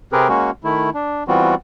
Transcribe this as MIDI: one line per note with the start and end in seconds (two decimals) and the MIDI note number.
0.12 0.28 48
0.12 0.28 60
0.12 0.28 67
0.12 0.28 68
0.12 0.28 70
0.12 0.28 71
0.28 0.51 56
0.28 0.51 58
0.28 0.51 61
0.28 0.51 66
0.64 0.90 51
0.64 0.90 57
0.64 0.90 64
0.94 1.24 62
1.28 1.55 52
1.28 1.55 55
1.28 1.55 59
1.28 1.55 60
1.28 1.55 65
1.28 1.55 66